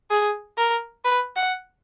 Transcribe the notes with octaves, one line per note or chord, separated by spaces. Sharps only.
G#4
A#4
B4
F#5